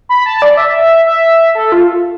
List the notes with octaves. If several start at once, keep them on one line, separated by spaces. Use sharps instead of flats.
B5
A5
D5
E5
E5
A4
F4